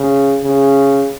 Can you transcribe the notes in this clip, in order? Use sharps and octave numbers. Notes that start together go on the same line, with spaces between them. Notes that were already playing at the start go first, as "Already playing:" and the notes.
Already playing: C#3
C#3